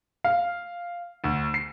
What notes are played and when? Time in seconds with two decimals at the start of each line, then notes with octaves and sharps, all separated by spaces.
0.24 F5
1.24 D2
1.54 C7